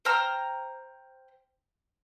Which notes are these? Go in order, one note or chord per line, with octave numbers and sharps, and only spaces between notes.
C5 G5 A#5 F6